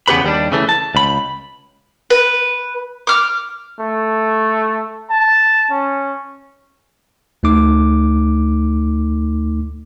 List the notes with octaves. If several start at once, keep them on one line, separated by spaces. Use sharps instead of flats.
E2 C#3 B3 G4 B4 B5
D#2 G3 D4
C#3 E3 A3
A5
C#2 B5
B4
D6 F6
A3
A5
C#4
D2 A3 D#4 D6